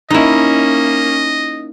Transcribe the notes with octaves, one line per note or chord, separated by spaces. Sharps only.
A#3 C#4 D#4 E4 D#5